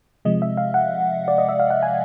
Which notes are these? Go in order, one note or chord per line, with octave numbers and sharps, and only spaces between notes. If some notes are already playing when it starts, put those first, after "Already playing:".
C3 F3 G#3 D#5
E5
F5
F#5
D5
D#5
E5
F5
F#5
G#5